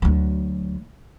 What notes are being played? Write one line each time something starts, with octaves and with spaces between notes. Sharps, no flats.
D2 F#3